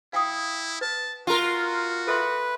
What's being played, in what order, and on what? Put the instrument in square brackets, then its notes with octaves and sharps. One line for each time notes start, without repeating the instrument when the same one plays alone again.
[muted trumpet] E4 [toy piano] F5 G5 D#6
[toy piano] B4 [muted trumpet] A5
[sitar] F4 A#4 [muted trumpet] F#4
[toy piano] A4 E5 C6 [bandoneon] B4